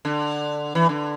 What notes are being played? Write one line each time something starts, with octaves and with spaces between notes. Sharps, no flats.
D3
E3
D3